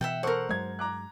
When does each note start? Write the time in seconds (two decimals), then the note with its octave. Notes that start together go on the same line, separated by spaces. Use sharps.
0.01 B2 E3 E5 F#5 G5
0.23 A4 A#4 C5 F#5 C#6
0.49 G2 F#3 G#3 C5 G#6
0.79 A#5 D6 F#6